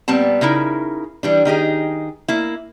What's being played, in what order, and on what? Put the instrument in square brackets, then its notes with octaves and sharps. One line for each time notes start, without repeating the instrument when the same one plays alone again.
[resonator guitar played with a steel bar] A#2 G3 B3 C4 A5
C#3 D#4 E4 A#4
E3 G3 D4
D#3 D#4 G4 G#4
A#3 E4